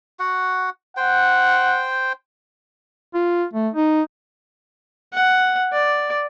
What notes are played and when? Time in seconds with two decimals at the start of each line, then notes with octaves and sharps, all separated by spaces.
0.19 F#4 F#5
0.97 C5 F#5 G5
3.14 F4
3.53 A3
3.74 D#4
5.13 F#5
5.73 D5